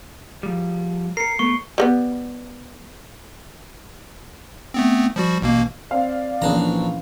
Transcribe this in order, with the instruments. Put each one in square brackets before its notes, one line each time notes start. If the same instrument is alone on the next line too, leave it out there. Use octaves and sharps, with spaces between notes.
[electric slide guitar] F3 G3
[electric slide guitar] A#4 [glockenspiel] C7 C#7
[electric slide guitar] A3 B3 [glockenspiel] C#6
[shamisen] G3 A#3 B3
[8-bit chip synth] A3 B3 C4
F3 G3 F#4
A1 B2 A#3
[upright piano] C4 F5 [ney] D5
[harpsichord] A#1 D4 A#5 [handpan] E3 C#4 B4